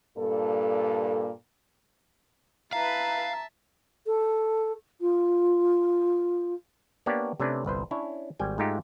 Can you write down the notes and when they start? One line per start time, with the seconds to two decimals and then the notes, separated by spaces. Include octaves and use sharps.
0.18 G2 A#2 A4
2.73 E4 B4 E5 F5 A5 A#5
4.07 A4
5.01 F4
7.06 A#3 B3 D4 G4 C#5 D5
7.40 C3 A3 C#4 D4 B4 D5
7.65 G1 C2 B4 C5
7.91 C#4 D4 E4 C#5
8.39 G#1 G3 G5 G#5
8.58 G#2 G#3 A3 D#4 F4 G4